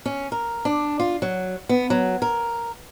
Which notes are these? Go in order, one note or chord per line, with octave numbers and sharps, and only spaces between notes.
C#4
A#4
D4
F4
F#3
B3
F#3
A#4